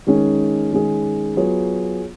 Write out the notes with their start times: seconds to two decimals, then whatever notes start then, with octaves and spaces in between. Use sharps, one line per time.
0.07 D#3 G#3 C#4 G#4
0.71 D#3 G#3 C#4 G#4
1.36 F#3 B3 F4 G#4 C#5